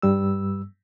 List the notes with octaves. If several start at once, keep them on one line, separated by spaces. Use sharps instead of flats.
G2 G3 E6